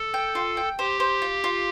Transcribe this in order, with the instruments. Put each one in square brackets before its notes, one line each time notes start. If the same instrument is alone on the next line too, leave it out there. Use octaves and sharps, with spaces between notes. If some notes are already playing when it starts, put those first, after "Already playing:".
Already playing: [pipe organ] A4
[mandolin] G5
F4
G5
[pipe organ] G4 [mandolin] C5
[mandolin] C5
F4
F4